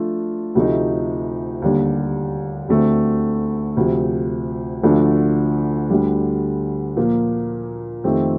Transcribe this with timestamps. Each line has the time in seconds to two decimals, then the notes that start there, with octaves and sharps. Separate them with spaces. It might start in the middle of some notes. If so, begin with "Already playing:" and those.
Already playing: F3 A3 D4 F4
0.55 D2 C3 F3 A3 D#4
1.62 D#2 D3 G3 D4
2.69 D2 D3 A3 C4
3.77 D2 C3 F3
4.83 D2 D3 F3 A3 D4
5.90 D2 D3 G3
6.97 A#2 F3 A#3
8.04 F2 D#3 A3 C4 G4